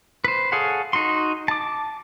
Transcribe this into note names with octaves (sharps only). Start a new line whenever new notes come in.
B4 C5
G#4 A4 C#5 F5 F#5
D#4 F#4 C6
A5 D6